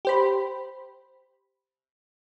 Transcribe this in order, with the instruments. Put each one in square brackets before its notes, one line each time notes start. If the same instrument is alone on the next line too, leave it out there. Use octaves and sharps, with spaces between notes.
[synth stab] G4 C5 B5